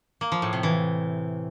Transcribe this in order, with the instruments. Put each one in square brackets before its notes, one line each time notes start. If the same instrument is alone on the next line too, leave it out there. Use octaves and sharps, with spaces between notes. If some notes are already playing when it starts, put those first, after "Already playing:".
[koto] A#3
F3
A2
C3
E3